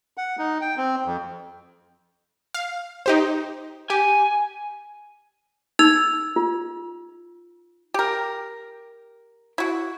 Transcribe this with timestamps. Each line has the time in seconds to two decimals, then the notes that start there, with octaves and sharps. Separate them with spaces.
0.17 F#5
0.39 D#4
0.61 G5
0.77 C4
1.06 F2
2.54 F5
3.06 D#4 G4 C5
3.90 G4 G#5
5.79 D#4 E6 G#6 F7
6.36 F4
7.94 G4 A#4
9.58 E4 F#4